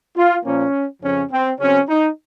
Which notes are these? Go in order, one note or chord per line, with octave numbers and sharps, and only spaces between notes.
F4
A#2 F3 A#3 C#4
F2 C#3 F3 C#4
C4
C#3 F#3 C4 C#4
D#4